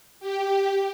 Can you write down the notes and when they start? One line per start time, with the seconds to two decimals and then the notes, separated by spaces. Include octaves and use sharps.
0.20 G4